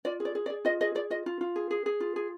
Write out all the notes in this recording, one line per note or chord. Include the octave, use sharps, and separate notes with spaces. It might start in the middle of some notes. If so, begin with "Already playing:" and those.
F4 D5
G#4
D5
G#4
D5
G#4
F4 D#5
G#4 D#5
G#4 D5
F4 D#5
F4
F4
G#4
G#4
G#4
F4
G#4